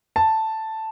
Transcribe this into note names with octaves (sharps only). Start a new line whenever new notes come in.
A5